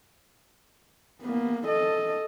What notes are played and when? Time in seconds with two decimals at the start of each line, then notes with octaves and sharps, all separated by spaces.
1.22 A#3 B3
1.67 A4 D#5